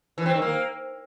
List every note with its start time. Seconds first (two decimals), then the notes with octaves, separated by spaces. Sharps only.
0.18 E3
0.26 C4
0.34 D#3
0.42 A#3